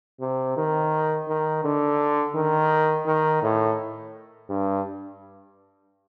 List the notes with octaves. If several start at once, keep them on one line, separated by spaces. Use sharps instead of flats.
C3
D#3
D#3
D3
D#3
D#3
A2
G2